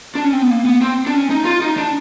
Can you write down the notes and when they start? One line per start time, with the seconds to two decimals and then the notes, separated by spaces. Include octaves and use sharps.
0.15 D4
0.24 C#4
0.33 C4
0.42 B3
0.50 A#3
0.65 B3
0.81 C4
1.07 D4
1.14 C#4
1.30 D#4
1.45 F4
1.62 D#4
1.77 D4